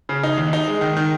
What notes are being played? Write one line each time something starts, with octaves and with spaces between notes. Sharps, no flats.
C#3
D#4
D#2
D#4
G#3
D#3
D#3